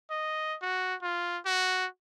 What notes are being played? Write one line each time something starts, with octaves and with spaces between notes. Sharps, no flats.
D#5
F#4
F4
F#4